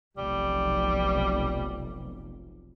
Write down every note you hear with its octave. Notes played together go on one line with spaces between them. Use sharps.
F1 B1 G3